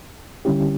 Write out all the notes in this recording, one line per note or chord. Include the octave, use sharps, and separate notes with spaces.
D3 G3 C#4 E4 G4